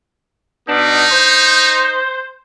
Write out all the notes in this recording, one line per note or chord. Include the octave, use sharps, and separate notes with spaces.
B2 B3 D4 D#4
C5